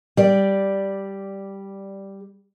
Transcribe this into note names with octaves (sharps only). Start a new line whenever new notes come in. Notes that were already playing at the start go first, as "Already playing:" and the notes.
G3 D5